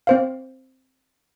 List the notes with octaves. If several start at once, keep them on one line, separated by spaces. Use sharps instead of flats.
C4 C5 F5